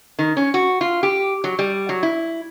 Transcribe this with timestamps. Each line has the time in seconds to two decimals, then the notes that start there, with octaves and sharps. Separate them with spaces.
0.19 D#3
0.37 C#4
0.54 F#4
0.81 F4
1.03 G4
1.44 F#3
1.59 G3
1.89 F#3
2.03 E4